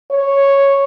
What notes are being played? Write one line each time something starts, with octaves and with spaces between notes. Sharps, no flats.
C#5